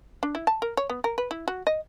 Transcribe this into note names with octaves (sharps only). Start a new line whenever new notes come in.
D4
E4
A5
A#4
C#5
B3
A#4
B4
E4
F#4
D#5